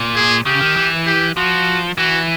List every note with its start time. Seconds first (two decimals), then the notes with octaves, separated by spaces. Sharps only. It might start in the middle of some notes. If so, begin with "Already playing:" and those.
Already playing: A#2
0.16 G#4
0.46 C#3 G4
0.61 D#3
0.76 E3
1.07 G4
1.37 F3 F#4
1.98 E3 F#4